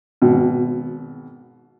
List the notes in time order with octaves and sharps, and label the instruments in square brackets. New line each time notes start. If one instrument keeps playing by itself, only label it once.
[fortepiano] G#1 B2